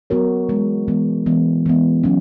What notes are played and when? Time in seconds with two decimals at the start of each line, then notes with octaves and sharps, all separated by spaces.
0.10 F#3 B3 F#4 A#4 C#5
0.48 E3 G#3 B3
0.88 E3 G#3 B3
1.26 E3 G#3 B3
1.66 E3 G#3 B3
2.04 F#3 C#4